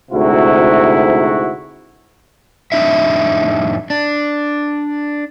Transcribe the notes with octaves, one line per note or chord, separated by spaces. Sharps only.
D2 G#2 C3 E4 F#4
F2 A2 D4 D#4 E5
D4